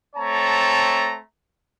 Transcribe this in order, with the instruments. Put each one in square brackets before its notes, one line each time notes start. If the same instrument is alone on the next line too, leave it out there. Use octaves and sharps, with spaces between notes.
[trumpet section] A3 C4 C#5 A5 A#5